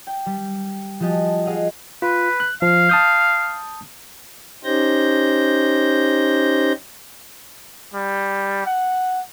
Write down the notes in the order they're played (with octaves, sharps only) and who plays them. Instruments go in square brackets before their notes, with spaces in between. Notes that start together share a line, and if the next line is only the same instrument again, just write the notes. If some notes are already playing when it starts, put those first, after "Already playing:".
[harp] G5
G3
F3 F#4 G4 D#5 G#5 A5
G#4 D#5 F5 F#5
[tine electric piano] F4 [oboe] B4
[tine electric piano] F#6
[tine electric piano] F3 [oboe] F5
[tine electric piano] A5 D#6 G6
[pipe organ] C#4 D#4 G4 C5 G6 A#6
[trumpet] G3
F#5